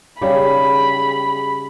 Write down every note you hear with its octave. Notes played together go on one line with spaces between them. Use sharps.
C#3 G3 D#4 G4 G#4 B5